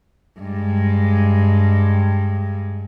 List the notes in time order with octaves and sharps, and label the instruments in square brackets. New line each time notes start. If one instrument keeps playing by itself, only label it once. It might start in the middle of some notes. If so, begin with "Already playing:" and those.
[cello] G2 G#3